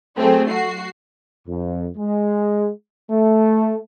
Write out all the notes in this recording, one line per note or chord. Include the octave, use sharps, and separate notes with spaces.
F#3 A3 C4 G#4
F#4 C7
F2
G#3
A3